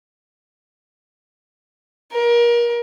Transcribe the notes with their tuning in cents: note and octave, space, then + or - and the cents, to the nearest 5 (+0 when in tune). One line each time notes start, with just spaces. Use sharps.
A#4 +30